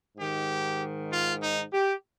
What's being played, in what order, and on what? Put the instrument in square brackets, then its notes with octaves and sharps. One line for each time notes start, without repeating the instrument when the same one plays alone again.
[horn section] G#2 D#3 G4
F4
D#4
G4